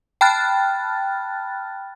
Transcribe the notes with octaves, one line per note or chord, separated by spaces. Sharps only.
G5 A5 B5 F6 F#6 A6